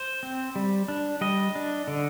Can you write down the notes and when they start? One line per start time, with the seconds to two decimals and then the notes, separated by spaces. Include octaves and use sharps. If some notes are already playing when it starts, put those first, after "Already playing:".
Already playing: C5
0.23 C4
0.56 G3
0.88 D4
1.21 G3 D#5
1.56 D4
1.88 D3